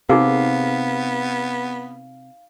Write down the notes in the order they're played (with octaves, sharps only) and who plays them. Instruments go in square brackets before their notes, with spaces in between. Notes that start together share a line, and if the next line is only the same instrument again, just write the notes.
[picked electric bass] C3 [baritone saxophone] B3 [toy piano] D#4 G#4 A#4 [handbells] F5